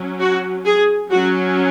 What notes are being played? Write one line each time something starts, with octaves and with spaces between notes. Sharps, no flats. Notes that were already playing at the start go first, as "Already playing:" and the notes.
Already playing: F#3 C#4
F#4
G#4
F#3 C#4 F#4